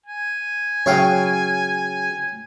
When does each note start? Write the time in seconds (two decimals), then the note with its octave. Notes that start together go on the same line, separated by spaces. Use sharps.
0.06 G#5
0.86 C#3 F#3 C#5 F5 G5